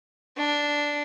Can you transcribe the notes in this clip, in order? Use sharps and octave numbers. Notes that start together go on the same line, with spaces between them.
D4